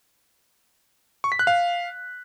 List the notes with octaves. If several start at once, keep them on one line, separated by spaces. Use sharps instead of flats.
C#6
B6
F#6
F5